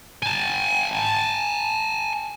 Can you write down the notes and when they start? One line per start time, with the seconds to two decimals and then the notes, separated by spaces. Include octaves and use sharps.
0.23 G#5 A5